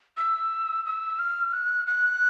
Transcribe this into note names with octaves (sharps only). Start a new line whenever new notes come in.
E6
E6
F6
F#6
F#6